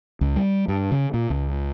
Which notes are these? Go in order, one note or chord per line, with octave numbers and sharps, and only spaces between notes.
C#2
G3
G2
C#3
A#2
C#2